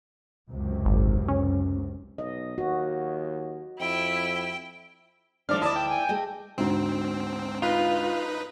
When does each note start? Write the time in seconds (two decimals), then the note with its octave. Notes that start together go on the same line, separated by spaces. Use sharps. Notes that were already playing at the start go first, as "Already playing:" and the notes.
0.49 C#2 F#2 C3
0.85 G#1
1.28 C#4
2.18 B1 D#5
2.58 D#2 F#4
3.80 F2 E4 G5
5.49 D#2 F3 A3 D4 D5 F6
5.62 D2 E4 D5 D#5 A5
5.76 G5
5.89 G#5
6.09 A3 G#4 D#5
6.58 D2 G#2 C4
7.62 D#4 F4 B4